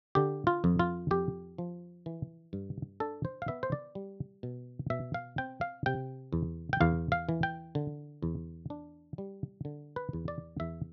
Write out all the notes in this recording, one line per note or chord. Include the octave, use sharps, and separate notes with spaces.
D3 G4
F4
F2
F4
F2 G4
F3
E3
G2
D4 A4
C5
F5
B3 E5
C5
D5
G3
B2
B2 E5
F5
C4 G5
F5
C3 G5
E2
G5
E2 F5
F5
E3
G5
D3
E2
D4
G3
D3
B4
E2
D5
E2 E5